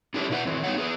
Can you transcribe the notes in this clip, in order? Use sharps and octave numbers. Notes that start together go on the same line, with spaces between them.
C#4 D4 E4 G4 A#4
B2 D4 E4 B4 F#5
D#3 E3 C4
G3 B3 C#4 D#4 C#5 F#5
B3 G#4 B4